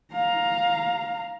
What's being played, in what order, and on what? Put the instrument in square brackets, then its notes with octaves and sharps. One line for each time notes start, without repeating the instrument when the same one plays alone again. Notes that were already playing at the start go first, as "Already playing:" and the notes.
[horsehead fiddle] F5 A#5